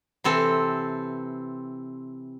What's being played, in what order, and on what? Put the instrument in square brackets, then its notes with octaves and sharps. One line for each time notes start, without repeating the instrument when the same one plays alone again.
[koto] C3 E3 C4 A4